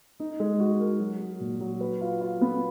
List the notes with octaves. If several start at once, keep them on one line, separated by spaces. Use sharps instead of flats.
D#4
G#3
F#4
A#4
F#3
F#3
A#2
F#3
B4
F4
F4
B3